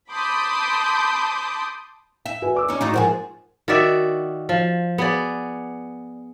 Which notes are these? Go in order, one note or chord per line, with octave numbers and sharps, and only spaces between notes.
A5 B5 C6 D6 D#6 G6
E5
F#4 B4 G#5
D5 D6 E6
C#4 D#4
A2 F#3 D#4
G#2 F3 G#4 A#4 C5 F#5
D#3 F#4 D5 E5
F3
B3 G#4 D5